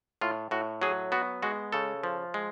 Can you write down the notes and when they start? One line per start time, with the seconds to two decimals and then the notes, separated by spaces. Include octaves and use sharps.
0.21 A2 F4
0.51 A2 F#4
0.82 F#3 G#4
1.12 B3 F#4
1.42 G#3 F#4
1.73 C#3 A4
2.04 F3
2.34 G#3